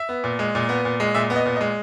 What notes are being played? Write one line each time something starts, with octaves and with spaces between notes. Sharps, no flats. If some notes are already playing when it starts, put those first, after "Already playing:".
Already playing: E5
B3
A#2
G#3
A#2
B3
A#2
G#3
A#2 E5
B3
D#5
A#2
D#5
G#3